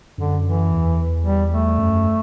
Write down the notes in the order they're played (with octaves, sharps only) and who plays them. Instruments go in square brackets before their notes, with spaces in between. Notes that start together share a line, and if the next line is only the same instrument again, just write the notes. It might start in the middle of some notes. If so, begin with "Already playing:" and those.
[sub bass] F#2 [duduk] D3
[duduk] E3
[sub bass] E2
[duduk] G3
A3
[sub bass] F#2